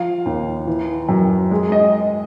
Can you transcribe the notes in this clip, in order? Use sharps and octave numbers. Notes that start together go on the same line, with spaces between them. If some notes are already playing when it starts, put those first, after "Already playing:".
Already playing: F3 F5
D#2
E3
F#2
G#3
D#5